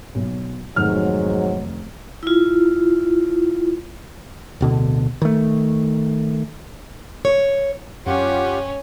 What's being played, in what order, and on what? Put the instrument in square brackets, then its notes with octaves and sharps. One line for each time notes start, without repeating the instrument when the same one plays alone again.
[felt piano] B1
[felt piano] F1 D#3 F6 [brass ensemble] G#2 F#3
[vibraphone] E4 F4
[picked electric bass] D1 B2 D3
D#3 A3
[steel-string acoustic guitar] C#5
[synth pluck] F#2 [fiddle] C#4 [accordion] F4 G4 F#5